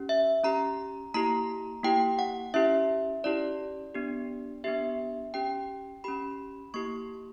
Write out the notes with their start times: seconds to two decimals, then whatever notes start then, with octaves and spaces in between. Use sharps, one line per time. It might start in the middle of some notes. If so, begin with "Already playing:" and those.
Already playing: C#4 G4
0.09 E5
0.44 C#4 G4 A#5
1.14 A#3 E4 G4 A#5
1.83 A#3 E4 G4 G5
2.19 F#5
2.54 C#4 E4 G4 E5
3.24 C#4 E4 G4 D5
3.95 B3 D4 G4
4.64 B3 D4 G4 E5
5.34 C#4 G4 G5
6.04 C#4 G4 B5
6.74 A#3 E4 G4 C#6